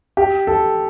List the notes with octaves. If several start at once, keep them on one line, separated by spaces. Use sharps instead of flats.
G4
A4